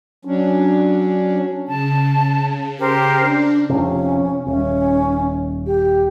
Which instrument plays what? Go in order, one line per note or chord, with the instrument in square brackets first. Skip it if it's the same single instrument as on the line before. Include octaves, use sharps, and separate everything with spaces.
[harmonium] F#3 C#4 D4
[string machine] C#3 [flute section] A5
[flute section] G4 A#4 C5
[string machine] D4
[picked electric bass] F1 F2 C3 [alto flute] C#4
[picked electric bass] D#1 [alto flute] C#4
[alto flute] G4